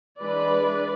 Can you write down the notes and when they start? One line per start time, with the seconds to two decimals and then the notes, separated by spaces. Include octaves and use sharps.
0.20 E3 G#3 D4 B4 D5